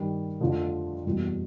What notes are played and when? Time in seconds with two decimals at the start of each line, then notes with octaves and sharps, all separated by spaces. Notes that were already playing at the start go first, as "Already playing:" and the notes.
Already playing: G2 D#3 G3
0.40 F2 D3 F3 A3
1.05 F#1 E2 B2 G3